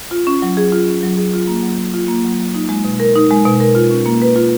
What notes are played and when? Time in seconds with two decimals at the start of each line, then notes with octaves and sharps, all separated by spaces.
0.11 F4
0.27 C#4
0.42 F#3
0.57 G#4
0.72 F4
0.88 C#4
1.03 F#3
1.17 G#4
1.33 F4
1.48 A#3
1.63 F#3
1.79 F#3
1.94 F4
2.08 A#3
2.24 F#3
2.39 F#3
2.54 D#4
2.69 G#3
2.85 B2
3.00 A#4
3.15 D#4
3.30 G#3
3.45 B2
3.60 A#4
3.75 F4
3.91 C#4
4.06 A#3
4.22 B4
4.36 F4